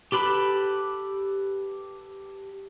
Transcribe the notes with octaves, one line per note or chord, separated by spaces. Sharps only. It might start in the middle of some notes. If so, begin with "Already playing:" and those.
G4 A4 B4 B5